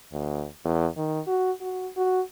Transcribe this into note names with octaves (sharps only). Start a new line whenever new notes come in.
D2
E2
D#3
F#4
F#4
F#4